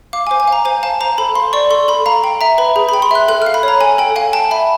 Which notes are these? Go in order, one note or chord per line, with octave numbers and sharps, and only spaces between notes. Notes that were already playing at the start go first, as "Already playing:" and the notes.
F5 D6
G#5
C5
G#5
F5 A#5
C5 G#5
F5 A5
C5 A#5
A4 B5
F5 C6
D5 C#6
A4 C6
A4 B5
F5 A#5
G5
E5 A#5
B4 B5
G#4
G5 B5
C6
E5 F#6
A4 F#6
F5 F6
B5
C#5 A#5
A4 G#5
A4 G5
F5 G#5
G5 A5
E5 B5